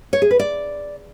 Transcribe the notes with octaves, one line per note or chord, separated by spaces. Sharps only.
C#5
G#4
B4
D5